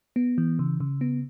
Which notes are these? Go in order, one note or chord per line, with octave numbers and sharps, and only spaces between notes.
B3
E3
C#3
C#3
B3